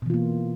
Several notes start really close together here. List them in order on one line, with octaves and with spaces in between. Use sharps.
B2 E3 F4 A#3